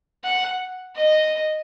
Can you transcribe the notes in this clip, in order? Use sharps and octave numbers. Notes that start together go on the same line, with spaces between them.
F#5
D#5